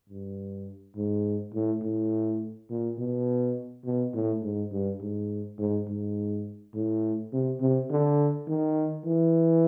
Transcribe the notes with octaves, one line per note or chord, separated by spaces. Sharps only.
G2
G#2
A2
A2
A#2
B2
B2
A2
G#2
G2
G#2
G#2
G#2
A2
C3
C3
D3
D#3
E3